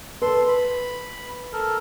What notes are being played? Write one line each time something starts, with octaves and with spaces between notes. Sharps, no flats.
A4 B4 C6
B5
A4 A#4